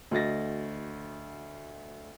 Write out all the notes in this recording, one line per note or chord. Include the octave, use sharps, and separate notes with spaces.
D2 F#4 D#5 A6 A#6